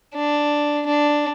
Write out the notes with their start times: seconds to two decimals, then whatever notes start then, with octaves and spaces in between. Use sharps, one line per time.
0.15 D4
0.87 D4